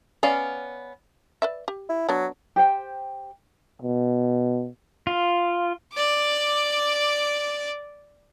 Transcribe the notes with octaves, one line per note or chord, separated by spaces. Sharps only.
B3 C#4 D5 F5
B4 D5 E5
G4
E4
F#3 B3 D4
G4 C5 G5
B2
F4
D5 D6